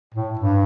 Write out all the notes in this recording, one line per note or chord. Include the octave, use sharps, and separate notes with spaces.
A2
G2